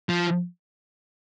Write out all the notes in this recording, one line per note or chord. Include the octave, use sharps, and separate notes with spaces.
F3